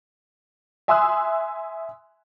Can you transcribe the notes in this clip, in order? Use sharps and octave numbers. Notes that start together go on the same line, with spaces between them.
E5 G#5 C6 D#6 E6 F#6